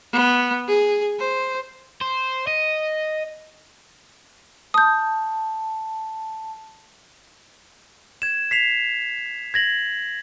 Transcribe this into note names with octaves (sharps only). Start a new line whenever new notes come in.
B3
G#4
C5
C5
D#5
A5 D#6 G6
G#6 E7
B6 C7 F7
G#6 A#6 F#7